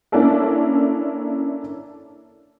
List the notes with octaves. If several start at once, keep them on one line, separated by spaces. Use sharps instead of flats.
A#3 C#4 D4 E4 A4 A#4